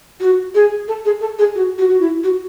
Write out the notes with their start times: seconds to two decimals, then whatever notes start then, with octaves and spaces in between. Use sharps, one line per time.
0.20 F#4
0.55 G#4
0.88 A4
1.05 G#4
1.21 A4
1.39 G#4
1.55 F#4
1.78 F#4
1.89 F#4
2.01 E4
2.24 F#4